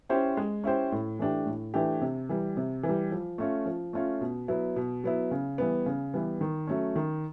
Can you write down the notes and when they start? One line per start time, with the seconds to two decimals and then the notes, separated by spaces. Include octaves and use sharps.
0.09 C#4 E4 G4 C5
0.37 G#3
0.64 C#4 E4 G4 C5
0.92 A2
1.19 E3 A3 D4 G4
1.46 A2
1.74 E3 A3 D4 G4
2.01 C3
2.29 E3 G3
2.57 C3
2.83 E3
2.89 G3
3.11 F3
3.38 A3 C#4 F4
3.66 F3
3.93 A3 C#4 F4
4.21 B2
4.48 F#3 B3 E4
4.76 B2
5.04 F#3 B3 E4
5.31 C#3
5.58 E3 G3 B3
5.86 C#3
6.14 E3 G3 B3
6.41 D#3
6.67 F#3 A3 C#4
6.96 D#3